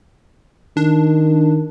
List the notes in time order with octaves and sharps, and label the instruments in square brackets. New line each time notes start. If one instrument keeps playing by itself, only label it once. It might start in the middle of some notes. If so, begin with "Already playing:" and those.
[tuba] D#3 [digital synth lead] D4